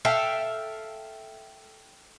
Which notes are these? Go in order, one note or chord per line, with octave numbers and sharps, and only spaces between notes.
A4 E5 F5 G5